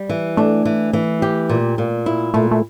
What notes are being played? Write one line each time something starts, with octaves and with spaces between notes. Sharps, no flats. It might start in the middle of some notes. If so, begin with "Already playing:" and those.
Already playing: G3
E3
A3 D4
E3
E3
G4
A#2
A#2
E4
A#2 A3
A3